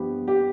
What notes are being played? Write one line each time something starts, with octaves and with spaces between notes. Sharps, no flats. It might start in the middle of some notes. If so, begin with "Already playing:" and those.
Already playing: G2 F3 B3 G4
G4